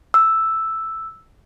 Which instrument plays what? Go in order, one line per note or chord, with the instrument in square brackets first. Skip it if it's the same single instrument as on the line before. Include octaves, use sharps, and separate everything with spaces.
[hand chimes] E6